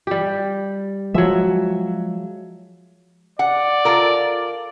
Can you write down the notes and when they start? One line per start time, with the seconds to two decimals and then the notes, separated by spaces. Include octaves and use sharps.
0.07 G3 G4
1.14 F3 F#3 G#3 E5
3.39 D5 F#5
3.85 F4 A4 A#4